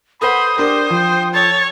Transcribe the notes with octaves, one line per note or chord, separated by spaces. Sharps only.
A4 B4 C5 F#5 B5 D#6
D4 G4 A#4 C5
F3 G5
A4 C#5 A6